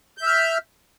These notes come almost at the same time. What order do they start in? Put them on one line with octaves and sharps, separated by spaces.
G6 E5 F6